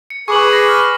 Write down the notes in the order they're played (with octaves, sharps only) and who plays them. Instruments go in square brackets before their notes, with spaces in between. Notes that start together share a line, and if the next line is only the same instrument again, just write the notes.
[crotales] C#7
[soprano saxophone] G#4 [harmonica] B4 [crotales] C#6 D6 F#7
[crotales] A#6 C7
F6